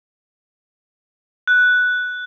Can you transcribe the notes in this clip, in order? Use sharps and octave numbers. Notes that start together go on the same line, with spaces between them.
F#6